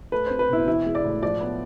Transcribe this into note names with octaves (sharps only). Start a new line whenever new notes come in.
A3 B4
C4 C5
B4
B2 E4
E3 E4
G#3
D5
A2
F3 D5
B3